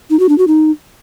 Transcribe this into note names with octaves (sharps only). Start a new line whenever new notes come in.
D#4
F#4
D4
F#4
D#4